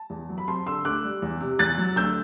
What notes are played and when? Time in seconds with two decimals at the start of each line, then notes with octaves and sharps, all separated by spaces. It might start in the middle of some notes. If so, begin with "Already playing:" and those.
Already playing: A5
0.10 E2
0.29 F#3
0.38 B5
0.48 C4 A5 C6
0.66 D3 C6 E6
0.85 D2 D6 F#6
1.04 G3
1.22 E2
1.40 C3
1.59 E2 F#6 A6
1.78 F#3
1.96 D2 E6 G6